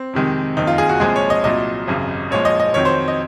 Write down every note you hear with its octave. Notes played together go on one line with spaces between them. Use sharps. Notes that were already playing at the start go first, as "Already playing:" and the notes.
Already playing: C4
F2 C3 D#3 G#3
F#1 F2 D#3 D#4
F4
G#4
F#4
C2 A#2 F3 G#3 G#4
C#5
D#5
C2 A#2 F#3 D#5
G#1 F#2 C#3
A#1 A#2 F3 G#3 C#5
D#5
D#5
F2 D#3 F#3 C#5
C5
D#5